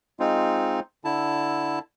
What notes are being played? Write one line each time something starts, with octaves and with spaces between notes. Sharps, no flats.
G#3 C4 D#4 F4
D3 E4 A5